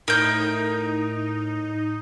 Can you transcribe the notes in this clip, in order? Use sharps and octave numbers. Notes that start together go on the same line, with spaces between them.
A2 D#4 A#4 G6